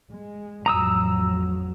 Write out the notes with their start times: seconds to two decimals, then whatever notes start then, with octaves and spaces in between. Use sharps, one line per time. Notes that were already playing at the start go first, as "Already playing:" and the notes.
0.10 G#3
0.66 A1 F2 F#3 A#5 D#6 E6